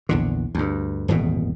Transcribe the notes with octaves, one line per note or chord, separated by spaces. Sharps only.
A#1 E2 D3
D2 G2
D#1 G#1 E2 B2